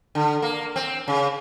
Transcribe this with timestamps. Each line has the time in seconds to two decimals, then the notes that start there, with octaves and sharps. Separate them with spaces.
0.15 D3
0.42 A#3
0.76 C4
1.08 C#3